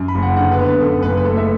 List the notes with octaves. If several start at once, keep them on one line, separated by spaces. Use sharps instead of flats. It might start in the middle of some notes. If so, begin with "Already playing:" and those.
Already playing: F#2
B5
F#1
F#5
D3 F#5
B4
B3
B4
F#2 A4
F#1 B4
B4
A3 A4
E5